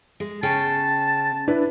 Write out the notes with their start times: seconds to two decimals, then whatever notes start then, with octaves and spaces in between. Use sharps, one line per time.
0.20 G#3
0.43 C#3 C#4 G5 A5
1.48 D4 E4 B4